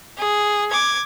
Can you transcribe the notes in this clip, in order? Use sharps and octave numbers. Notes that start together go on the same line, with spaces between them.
G#4
D6 G#6